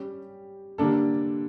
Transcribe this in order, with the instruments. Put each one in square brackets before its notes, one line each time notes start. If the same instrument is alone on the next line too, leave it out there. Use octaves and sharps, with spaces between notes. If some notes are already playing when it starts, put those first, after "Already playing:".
Already playing: [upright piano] G3 C#4 G4
D3 G3 A#3 D4 A4